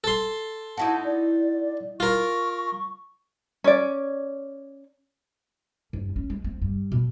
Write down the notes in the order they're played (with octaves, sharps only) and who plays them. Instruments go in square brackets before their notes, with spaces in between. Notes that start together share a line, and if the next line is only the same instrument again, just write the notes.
[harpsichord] A4 C6
[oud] D#4 E4 F#4 [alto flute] A5
[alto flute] D5
[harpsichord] F4 A#4 [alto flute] C#6
[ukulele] C#4 D5
[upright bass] G2
C#4
G#3
C4
G2
B2